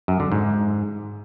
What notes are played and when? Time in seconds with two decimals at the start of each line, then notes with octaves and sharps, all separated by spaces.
0.08 F#2
0.20 D3
0.32 G#2